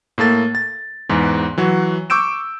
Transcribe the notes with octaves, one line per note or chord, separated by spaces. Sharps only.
A2 A#3 A4 A6
A6
E2 G#2 E3
E3 F#3 F#4
C#6 D6 E6 G6 D7 E7